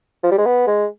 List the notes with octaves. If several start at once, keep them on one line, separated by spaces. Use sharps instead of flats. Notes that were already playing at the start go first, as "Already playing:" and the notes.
F3
G3
G#3
B3
G#3